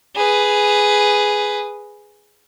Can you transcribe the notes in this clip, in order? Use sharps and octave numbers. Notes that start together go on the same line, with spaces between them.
G#4 B4